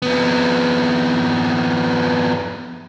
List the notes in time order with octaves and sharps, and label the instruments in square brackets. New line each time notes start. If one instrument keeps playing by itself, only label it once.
[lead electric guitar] F2 B3